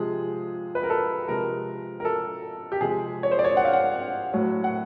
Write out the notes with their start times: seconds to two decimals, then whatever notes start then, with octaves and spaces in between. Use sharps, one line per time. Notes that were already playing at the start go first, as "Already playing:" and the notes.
Already playing: C3 F3 G#3 G#4
0.75 B4
0.83 A#4
0.90 A4
1.28 C3 F3 G#3 A#4
2.00 A#4
2.05 A4
2.72 G4
2.80 C3 F3 G#3 G#4
3.23 C#5
3.32 C5
3.39 D5
3.45 C#5
3.57 F#5
3.65 F5
3.73 F#5
4.34 A2 F#3
4.64 F#5